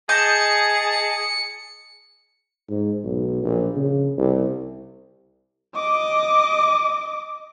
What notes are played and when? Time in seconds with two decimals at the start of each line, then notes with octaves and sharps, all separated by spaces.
0.09 G#4 D#5 A5 G6 C#7
2.70 G#2
3.04 B1
3.43 A#1
3.76 C#3
4.18 C2
5.75 D#5 D6